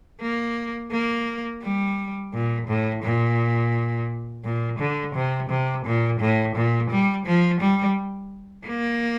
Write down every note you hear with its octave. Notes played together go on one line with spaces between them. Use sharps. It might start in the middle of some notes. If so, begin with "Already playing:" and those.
A#3
A#3
G3
A#2
A2
A#2
A#2
D3
C3
C3
A#2
A2
A#2
G3
F3
G3
A#3